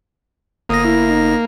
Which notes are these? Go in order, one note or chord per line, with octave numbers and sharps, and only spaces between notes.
G1 A#3 D#6 A#6
E4
D#4